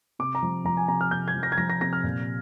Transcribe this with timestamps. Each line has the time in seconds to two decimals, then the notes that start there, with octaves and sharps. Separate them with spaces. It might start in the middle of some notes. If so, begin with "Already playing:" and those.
0.19 C3 D6
0.35 A#5
0.43 F3
0.65 F3 A#5
0.77 G#5
0.88 C3 A#5
1.01 F6
1.11 C3 G6
1.28 G#6
1.35 F3
1.43 A#6
1.52 G#6
1.58 F3 A#6
1.70 A#6
1.81 C3 A#6
1.93 F6
2.03 A#2